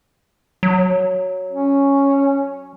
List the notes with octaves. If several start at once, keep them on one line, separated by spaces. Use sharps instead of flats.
F#3
C#4